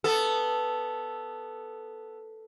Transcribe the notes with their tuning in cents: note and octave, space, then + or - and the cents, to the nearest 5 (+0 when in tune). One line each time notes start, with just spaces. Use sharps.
B3 +0 A4 +0